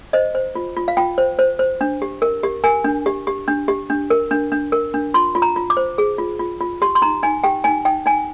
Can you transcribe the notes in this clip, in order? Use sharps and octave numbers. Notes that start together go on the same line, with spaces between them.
C5 D#5
C5
F4
F4
F5
F4 G5
C5
C5
C5
D4
G4
A#4
G4
A#4 G#5
D4
G4
G4
D4
G4
D4
A#4
D4
D4
A#4
D4
F4 C6
F4
A#5
F4
D6
C5
G#4
F4
F4
F4
G4 C6
C6
D#4 A#5
D#4 G#5
G4 G5
D#4 G#5
D#4 G5
D#4 G#5